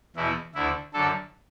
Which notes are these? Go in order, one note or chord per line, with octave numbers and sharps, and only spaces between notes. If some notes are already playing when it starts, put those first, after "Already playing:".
E2 B2 E4
D2 D3 E4
F#2 D3 A4